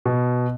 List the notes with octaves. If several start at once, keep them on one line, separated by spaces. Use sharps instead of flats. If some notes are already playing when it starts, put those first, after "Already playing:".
B2